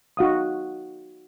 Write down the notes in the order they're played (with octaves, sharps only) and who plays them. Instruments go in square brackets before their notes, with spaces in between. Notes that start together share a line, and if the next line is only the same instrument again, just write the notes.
[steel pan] D#4 F#4 F5 D#6